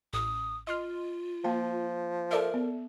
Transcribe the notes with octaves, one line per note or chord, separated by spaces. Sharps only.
A1 D#6
F4 D#5 C6 F6
F3 A#3 F5 A5
A4 A#4 D5 E5
B3